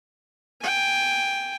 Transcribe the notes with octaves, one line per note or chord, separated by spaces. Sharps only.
G5 G#5